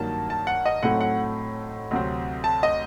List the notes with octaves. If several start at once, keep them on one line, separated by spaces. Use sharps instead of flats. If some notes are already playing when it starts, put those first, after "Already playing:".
Already playing: G2 D#3 F#3 A#3 A5
A5
F#5
D#5
A2 F#3 A3 C4 D#4 F#5
F#5
D2 C3 F#3 C4
A5
D#5